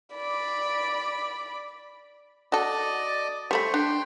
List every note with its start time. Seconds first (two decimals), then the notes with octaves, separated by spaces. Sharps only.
0.15 D5 B5
2.52 F#4 A4 D5 D#5
3.51 G3 A3 C5 B5 C#6
3.74 D4 G5 C6